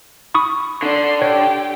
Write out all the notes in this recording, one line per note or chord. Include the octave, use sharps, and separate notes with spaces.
B5 C#6 D#6
D3 D4 C6
G4 C#5 G5